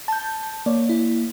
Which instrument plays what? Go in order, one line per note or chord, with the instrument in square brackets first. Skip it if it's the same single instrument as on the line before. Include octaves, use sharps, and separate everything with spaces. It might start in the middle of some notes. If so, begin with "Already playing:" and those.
[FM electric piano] A5 G6
[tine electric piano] A#3 [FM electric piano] C#5 D5
[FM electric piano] E4